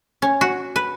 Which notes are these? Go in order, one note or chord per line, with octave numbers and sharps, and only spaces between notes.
C#4
F#4
B4